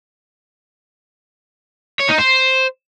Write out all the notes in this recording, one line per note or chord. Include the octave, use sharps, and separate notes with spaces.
C#5
D#4
C5